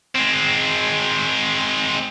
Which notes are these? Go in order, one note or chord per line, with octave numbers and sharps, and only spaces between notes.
G#3 C4